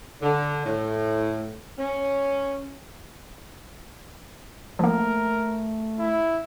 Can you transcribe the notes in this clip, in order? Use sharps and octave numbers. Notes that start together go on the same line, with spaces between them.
D3
A2
C#4
F3 A3 A#3 A#4
E4